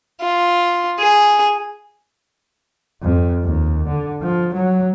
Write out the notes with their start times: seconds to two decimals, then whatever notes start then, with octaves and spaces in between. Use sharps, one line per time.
0.21 F4
0.99 G#4
3.02 F2
3.43 D#2
3.88 D3
4.22 F3
4.54 F#3